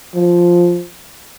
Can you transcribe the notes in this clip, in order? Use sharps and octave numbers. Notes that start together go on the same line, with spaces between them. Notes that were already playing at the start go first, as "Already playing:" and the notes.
F3